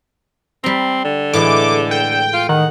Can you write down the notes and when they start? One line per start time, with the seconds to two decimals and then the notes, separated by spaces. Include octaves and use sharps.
0.64 G3 C4 A#5
1.04 D3
1.33 A2 E3 G#3 D6
1.91 G5
2.33 F4
2.49 D#3 F#5